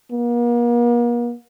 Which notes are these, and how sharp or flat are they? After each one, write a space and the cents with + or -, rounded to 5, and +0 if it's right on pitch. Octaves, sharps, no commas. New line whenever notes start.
A#3 +40